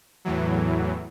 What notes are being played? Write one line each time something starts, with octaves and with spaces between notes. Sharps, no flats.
E2 A2 E3 F#3